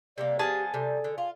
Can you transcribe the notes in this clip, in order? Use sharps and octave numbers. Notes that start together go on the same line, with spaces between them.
C3 G3 A#3 D5
F3 G#3 B3 G4 G#4 A5
C3 G3 A4
D3
F4 F5